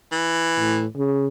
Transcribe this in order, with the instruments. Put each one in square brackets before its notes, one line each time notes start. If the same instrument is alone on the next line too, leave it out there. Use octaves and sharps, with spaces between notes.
[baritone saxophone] E3
[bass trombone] A2
C#3